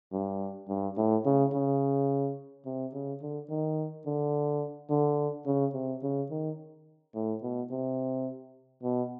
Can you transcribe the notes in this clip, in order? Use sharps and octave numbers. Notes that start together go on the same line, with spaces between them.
G2
G2
A2
C#3
C#3
C3
C#3
D3
D#3
D3
D3
C#3
C3
C#3
D#3
A2
B2
C3
B2